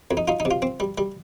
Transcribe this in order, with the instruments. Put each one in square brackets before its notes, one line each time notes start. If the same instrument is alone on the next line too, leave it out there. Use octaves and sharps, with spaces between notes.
[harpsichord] F2
D#4
D#4 F4
D#4
C3
F4
C4
G3
G3